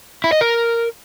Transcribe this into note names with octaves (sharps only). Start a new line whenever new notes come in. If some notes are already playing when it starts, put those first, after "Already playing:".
E4
D#5
A#4